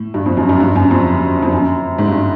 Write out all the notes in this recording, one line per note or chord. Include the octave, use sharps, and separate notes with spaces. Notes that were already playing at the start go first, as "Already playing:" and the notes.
Already playing: A2
G2
F2
F#2
F#2
G2
F#2
F2
F2
F#2
G#2
G2